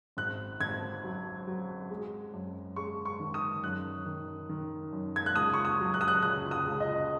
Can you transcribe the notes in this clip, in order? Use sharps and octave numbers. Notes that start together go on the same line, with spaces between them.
G#1 F#6
G#1 G#6
F#3
F#3
G#3
F#2
G#3 C#6
C#6
D#3
D#6
F#2 F#6
D#3
D#3
F#2
G#6
F#6
C#2 D#6
C#6
D#6
F#3
F#6
D#6
F#6
C#2 F#6
D#6
C#2
D#5